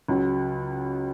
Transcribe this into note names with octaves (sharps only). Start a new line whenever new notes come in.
C#2 C#3 F#3